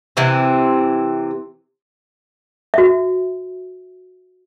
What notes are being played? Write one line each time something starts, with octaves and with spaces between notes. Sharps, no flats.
C3 E3 C4
F#4 E5